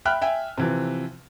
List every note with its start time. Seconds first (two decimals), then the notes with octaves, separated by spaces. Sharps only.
0.05 E5 G5 B5 F6 F#6
0.22 E5 G5 G#5
0.58 C3 E3 F3